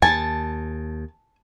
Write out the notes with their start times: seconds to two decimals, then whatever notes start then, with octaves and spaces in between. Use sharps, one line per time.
0.02 D#2 G#5 A5